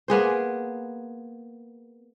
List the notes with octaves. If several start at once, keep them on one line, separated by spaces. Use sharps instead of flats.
A#3 B3 G#4 C5